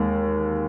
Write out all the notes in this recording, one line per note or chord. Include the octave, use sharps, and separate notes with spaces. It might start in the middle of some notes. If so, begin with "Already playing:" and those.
Already playing: D#2 D#3 G#3